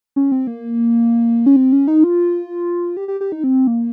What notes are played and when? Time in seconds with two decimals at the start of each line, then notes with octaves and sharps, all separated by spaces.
0.16 C#4
0.32 C4
0.47 A#3
1.46 C#4
1.56 C4
1.72 C#4
1.88 D#4
2.04 F4
2.97 G4
3.08 G4
3.21 G4
3.32 D#4
3.44 C4
3.67 A#3